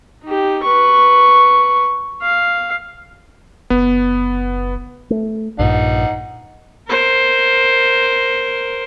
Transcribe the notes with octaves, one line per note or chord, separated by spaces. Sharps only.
D#4 G4
B4 C#6
F5
F#1 B3
A3
A#1 G2 A#2 D#4 F#5
A#4 C5